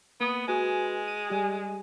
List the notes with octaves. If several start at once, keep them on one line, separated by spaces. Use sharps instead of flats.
A#3 B3 D#6
G#3 F#4 B4 G#5
D#7
G3 G4 G#5